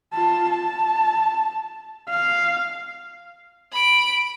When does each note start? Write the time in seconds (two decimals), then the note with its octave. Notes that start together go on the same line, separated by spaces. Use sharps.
0.13 F4 A5
0.50 A5
2.10 F5
3.73 B5 D7